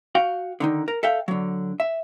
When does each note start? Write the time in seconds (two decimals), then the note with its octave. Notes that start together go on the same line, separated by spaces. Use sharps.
0.15 F#4 F5 G5
0.60 D3 D#3 D#4
0.88 A#4
1.03 A4 E5 F5 G5
1.28 D3 F#3
1.80 E5